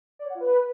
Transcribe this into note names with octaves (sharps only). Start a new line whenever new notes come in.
D5
C#5
F#5
F4
B4